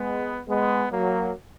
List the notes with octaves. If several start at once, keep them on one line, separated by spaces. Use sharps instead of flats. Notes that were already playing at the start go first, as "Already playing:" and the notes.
Already playing: G#3 B3
G#3 B3
F#3 A#3